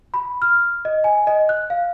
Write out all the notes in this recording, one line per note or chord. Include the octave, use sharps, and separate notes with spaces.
B5
F6
D#5
G#5
D#5
F#6
F5